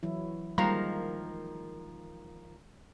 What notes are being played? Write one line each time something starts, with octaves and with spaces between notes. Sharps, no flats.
E3 F#3 E4
D#3 F3 G3 G#3 A#3 A#4 A#5